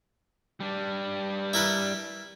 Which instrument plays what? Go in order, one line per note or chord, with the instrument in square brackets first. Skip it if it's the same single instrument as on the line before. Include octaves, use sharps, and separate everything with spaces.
[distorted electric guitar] G3 D4
[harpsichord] E4 A#4 B4